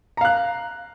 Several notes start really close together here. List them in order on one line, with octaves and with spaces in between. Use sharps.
A#5 F5 F#6